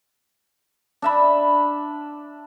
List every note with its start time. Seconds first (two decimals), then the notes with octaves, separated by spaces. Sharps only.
1.02 D4 E5 B5